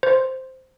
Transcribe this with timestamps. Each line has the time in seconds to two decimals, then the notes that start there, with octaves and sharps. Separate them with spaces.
0.03 C5